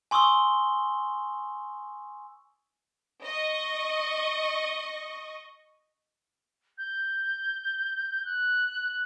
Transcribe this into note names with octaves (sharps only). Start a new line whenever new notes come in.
G#5 C6 C#6 D#6 E6 G7
D#5 C#6
G6
F#6